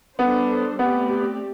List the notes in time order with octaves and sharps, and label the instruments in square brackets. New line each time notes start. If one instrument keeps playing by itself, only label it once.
[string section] G3 D4 A4 C5 [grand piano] B3
[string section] A3 C4 G4 D5 [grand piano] B3